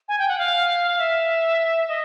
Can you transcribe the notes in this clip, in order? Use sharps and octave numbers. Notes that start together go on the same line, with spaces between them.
G#5
G5
F#5
F5
E5
D#5